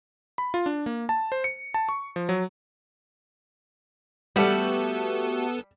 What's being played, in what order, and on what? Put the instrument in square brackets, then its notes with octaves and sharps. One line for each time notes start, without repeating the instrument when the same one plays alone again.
[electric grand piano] B5
F4
D4
A#3
A5
C5
C#7
A5
C#6
F3
F#3
[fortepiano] G3 [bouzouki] A3 F#4 G4 [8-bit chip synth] B3 A4